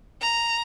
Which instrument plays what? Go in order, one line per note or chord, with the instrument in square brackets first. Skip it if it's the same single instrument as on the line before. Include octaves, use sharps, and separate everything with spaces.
[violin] A#5